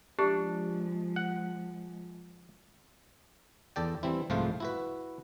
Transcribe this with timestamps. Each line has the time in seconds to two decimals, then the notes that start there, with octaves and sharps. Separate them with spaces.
0.19 F3 G#3 D4 G4
1.16 F#5
3.76 E2 A4 D5 G5
4.03 E3 G3 C4 E4
4.30 C2 G#2 F3 A3 F4 C5
4.60 E4 F#4 B4